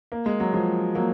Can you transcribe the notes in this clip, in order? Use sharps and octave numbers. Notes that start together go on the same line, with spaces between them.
A#3
G#3
F#3
F3 G#3
F#3 A#3